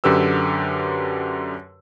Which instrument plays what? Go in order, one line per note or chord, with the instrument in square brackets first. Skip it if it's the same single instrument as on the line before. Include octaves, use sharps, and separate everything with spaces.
[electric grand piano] F#2 D3 G4 B4 E6